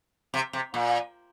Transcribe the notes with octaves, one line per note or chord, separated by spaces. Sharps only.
C3
C3
A#2